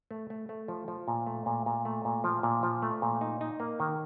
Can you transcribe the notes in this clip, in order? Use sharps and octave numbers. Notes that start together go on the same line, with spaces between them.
A3
A3
A3
F3
F3
A#2
A3
A#2
A#2
A3
A#2
F3
A#2
F3
A3
A#2
D#4
D#4
A#3
D#3